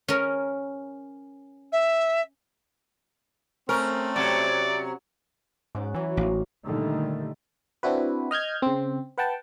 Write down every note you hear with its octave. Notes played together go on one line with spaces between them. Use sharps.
C#4 A#4
E5
A3 C4 C#4 A#4
C3 F#3 D5
G#2 C#4 F#5 D6
E3 F#3 G#5
A1 G#2 F5 A#5
A#2 D3 D#3 G3 A3
C4 D4 E4 F#4 B4
D#5 F6 G6 G#6
C#3 C4
B4 F#5 G5 A5